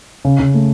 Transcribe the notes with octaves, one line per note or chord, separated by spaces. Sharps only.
C#3
C#3
A3